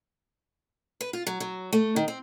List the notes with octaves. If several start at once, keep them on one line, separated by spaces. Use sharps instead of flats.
B4
F4
F#3
F#3
A3
D#3
C4